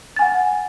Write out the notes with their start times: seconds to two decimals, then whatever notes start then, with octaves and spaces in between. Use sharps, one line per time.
0.16 A6
0.19 G#5
0.22 F#5